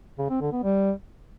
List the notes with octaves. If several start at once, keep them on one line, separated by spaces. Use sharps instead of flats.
C#3
C4
D3
B3
G3